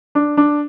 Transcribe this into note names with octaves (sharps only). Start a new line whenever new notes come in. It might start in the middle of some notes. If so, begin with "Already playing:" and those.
D4
D4